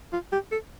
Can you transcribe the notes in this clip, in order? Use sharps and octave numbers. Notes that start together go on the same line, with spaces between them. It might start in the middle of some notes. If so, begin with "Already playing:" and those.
F4
G4
A4